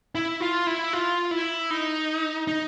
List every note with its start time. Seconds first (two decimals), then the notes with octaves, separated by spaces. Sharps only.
0.15 E4
0.41 F4
0.67 E4
0.93 F4
1.31 E4
1.71 D#4
2.47 D#4